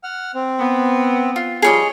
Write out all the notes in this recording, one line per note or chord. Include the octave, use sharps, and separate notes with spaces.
F#5 F6
C4
B3
F4
F3 G3 F4 G#4 C#5 D#5